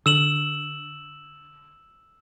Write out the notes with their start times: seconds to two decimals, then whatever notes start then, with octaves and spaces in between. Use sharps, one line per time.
0.06 D3 E6 E7 F#7